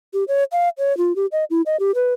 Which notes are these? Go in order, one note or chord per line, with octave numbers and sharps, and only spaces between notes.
G4
C#5
F5
C#5
F4
G4
D#5
E4
D#5
G4
B4